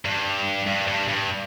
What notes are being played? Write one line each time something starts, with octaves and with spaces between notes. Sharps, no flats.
G2
G2
G2
G2